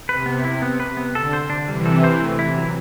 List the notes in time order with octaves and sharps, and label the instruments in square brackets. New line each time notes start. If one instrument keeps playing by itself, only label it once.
[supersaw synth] C3 [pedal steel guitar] B4
[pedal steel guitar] B3
E4
B3
B4
B3
[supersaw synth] D3 [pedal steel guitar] A4
[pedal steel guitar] C5
D4
[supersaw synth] C3 E3 [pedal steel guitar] G3
[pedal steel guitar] A4
C5
A3
E4
F#3